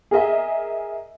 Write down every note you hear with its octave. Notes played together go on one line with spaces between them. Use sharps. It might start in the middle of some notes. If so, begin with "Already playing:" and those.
G#4 A#4 D#5 E5